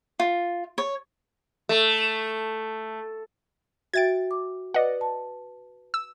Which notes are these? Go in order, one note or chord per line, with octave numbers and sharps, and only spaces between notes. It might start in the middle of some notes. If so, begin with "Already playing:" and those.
F4
C#5
A3
F#4 E5 G5 G#6 A6 D7
D6
B4 D5 D#5 F#5
A5
E6